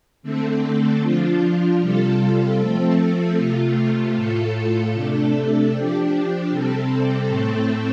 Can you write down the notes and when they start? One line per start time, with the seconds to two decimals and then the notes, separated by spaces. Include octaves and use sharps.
0.23 D3 A3 C4 A4
1.02 F3 D4 F4
1.80 C3 G3 F4 A4
2.59 F3 A3 C4 A4
3.36 C3 A3 F4
4.15 A2 A3 F4 A4
4.93 C3 A3 D4 A4
5.72 F3 D4 G4
6.50 C3 G3 C4 A4
7.29 A2 A3 C4 A4